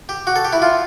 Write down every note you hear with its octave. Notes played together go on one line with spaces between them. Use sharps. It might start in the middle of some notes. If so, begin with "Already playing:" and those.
G4
F#4
A4
G4
E4
F4